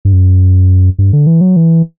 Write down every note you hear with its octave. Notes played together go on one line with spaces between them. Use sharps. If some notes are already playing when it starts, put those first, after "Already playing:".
G2
F#2
G2
D3
E3
F#3
E3